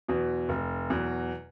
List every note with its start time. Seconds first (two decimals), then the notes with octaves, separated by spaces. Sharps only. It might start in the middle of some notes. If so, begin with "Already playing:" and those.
0.08 E2 B2 F#3
0.49 F1
0.90 E2 B2 F#3